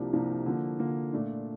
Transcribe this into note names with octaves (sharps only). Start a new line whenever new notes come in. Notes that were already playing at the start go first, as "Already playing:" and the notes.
Already playing: C2 C3 F3 A#3 D4
C2 C3 F3 A#3 D4
D3 F3 A#3
D3 F3 A#3
A#2 A3 D4 F4